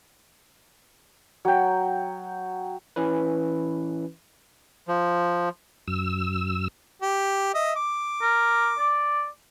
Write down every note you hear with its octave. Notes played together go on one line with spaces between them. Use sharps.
F#3 G5
E3 C#4 E4 B4
F3
F#2 E6
G4
D#5 E5
D6
A#4
D5